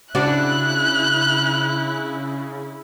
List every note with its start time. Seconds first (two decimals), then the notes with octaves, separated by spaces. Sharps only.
0.15 C#3 D4 E4 F#4 D5 F#6